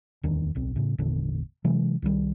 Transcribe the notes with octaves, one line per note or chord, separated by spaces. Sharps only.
D1 E2 D#3 D4
D1 B1 C4
A2 C#3
G#1 E2 A#2 D3
C3 E3 F#3 G#3
C2 D#3 G3